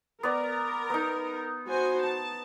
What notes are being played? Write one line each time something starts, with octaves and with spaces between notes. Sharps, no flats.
B3 A#4 D5
B3 D#4
F#4 C5 G#5
A5